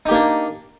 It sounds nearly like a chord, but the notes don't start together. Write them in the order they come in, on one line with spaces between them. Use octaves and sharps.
D#4 G4 A#3 D4